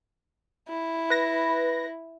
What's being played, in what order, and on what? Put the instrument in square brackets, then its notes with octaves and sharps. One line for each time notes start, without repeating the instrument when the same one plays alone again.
[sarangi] E4
[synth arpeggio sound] B4 A#6